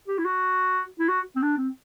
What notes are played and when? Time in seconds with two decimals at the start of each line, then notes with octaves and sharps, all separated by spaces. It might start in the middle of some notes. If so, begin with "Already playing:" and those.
0.08 G4
0.18 E4
0.25 F#4
0.99 E4
1.09 F#4
1.36 C4
1.42 D4
1.58 C4